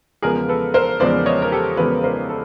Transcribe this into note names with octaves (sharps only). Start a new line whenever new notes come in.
E2 C#3 F3 G#3 B3 G#4 A#4
A4 B4
A#4 C5
E2 C#3 F3 G#3 B3 C5 D5
C#5 D#5
A#4
G4 A4
E2 C#3 F3 G#3 B3 A4 B4
A#4 C5
A4